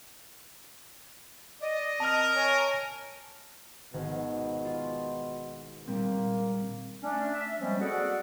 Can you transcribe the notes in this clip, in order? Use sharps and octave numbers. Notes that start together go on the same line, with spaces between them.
D5 D#5
C4 A#4 A5 F6
C#5 G#5
G#1 B2
F4
A#2 G3 A#3 C4
A3 C#4 D4
E5
F3 G3 G#3 A#3 C4 C#4
F#4 G#4 A4 D5 F#5